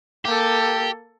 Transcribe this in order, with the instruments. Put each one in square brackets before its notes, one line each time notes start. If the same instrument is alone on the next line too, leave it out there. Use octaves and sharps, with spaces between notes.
[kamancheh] A#3 A4 [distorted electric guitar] G4